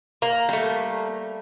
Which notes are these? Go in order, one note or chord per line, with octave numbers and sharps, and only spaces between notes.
A#3
G3 A3